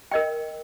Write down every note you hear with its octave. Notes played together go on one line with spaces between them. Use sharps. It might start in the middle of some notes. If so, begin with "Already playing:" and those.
A#4 D#5 G5